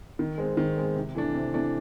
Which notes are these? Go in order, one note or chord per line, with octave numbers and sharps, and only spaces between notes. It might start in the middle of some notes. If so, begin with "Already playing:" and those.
D#3
G#3 C4
D#3
G#3 C4
C3
E3 A3 D4
C3
E3 A3 D4